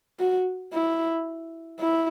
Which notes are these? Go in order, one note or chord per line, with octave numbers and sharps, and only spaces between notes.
F#4
E4
E4